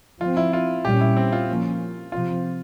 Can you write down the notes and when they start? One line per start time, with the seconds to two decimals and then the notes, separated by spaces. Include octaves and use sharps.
0.20 F3 C4 F4
0.37 E4
0.53 F4
0.85 A#2 G3 C#4 G4
1.01 E4
1.16 C4
1.32 F4
1.48 F3 A#3 C#4
2.12 C3 F3 C4 F4